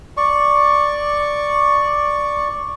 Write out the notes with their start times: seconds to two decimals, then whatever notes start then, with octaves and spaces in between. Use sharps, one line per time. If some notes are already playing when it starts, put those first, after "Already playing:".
0.17 D5 C#6